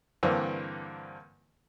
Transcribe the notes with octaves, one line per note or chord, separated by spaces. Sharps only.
G2 D3 E3 A#3 C4